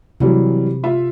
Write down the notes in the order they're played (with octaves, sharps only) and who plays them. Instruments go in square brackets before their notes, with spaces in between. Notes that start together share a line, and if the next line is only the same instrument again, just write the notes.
[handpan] C3 [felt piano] E3 F#3 G3
[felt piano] F4 E5